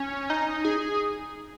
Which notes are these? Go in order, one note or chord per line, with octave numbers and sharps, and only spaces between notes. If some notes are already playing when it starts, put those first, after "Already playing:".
Already playing: C#4
D#4
G#4